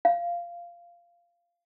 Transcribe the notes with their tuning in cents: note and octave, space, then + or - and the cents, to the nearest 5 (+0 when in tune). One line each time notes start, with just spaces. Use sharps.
F5 -15